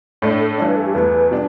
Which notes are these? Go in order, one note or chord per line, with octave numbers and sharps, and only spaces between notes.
A2 A3 D4 A4
A4
G2 E3 A3 D4
B4
A4
G4
E2 E3 A3 B4
B2 G3 D4